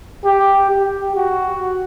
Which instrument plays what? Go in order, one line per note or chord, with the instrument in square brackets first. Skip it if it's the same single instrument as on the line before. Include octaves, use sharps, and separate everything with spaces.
[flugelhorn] G4
G4
F#4